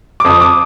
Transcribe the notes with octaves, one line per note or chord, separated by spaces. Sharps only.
D6
F2 F3 D#6
D6